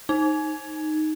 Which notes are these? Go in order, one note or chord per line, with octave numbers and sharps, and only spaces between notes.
D#4